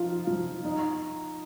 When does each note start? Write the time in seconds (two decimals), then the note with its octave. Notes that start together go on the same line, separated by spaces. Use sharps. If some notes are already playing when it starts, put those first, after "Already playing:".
Already playing: F3 D#4 F4
0.27 F3 F4
0.64 D#4 D#5